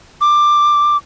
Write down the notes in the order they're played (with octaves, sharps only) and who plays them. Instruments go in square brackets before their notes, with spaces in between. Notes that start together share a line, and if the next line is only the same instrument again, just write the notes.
[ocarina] D6